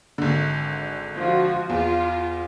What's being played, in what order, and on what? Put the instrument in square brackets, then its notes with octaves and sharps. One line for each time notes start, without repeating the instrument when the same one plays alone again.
[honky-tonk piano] G#1 D3
[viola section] F3 F#4
[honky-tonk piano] E2 [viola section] F4